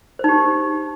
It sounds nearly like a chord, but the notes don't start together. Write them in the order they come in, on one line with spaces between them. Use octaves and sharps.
C5 D#4 G4